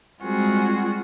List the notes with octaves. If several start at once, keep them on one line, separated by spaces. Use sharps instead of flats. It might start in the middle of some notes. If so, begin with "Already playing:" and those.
G3 G#3 C4 F4 F#4 G#4